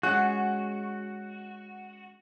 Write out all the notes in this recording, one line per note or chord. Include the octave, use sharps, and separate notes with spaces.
G#3 C#4 F#4 G#4 F#5 F#6